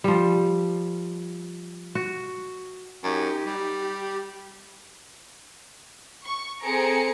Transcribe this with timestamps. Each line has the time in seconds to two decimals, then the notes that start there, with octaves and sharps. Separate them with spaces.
0.04 F3 G3
1.95 F#4
3.04 F#2 D#4 G4
3.45 G3
3.82 G4
6.22 C#6
6.60 C4 G#4 A4 A#5 C#7 D7